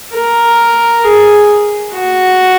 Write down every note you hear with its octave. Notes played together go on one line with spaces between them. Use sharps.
A#4
G#4
F#4